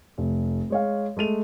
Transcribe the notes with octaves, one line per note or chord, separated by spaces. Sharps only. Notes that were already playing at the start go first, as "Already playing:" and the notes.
F1
G#3 C#5 F5
G#3 A3 D#7 F7